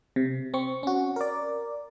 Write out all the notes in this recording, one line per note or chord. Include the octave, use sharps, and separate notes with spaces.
C3
C4 C#6
C#4 F#4
A#4 D5